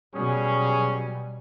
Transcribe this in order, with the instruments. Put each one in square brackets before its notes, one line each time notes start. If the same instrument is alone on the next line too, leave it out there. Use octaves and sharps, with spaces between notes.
[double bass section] B2 F#3 G3 [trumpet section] C#4 G#4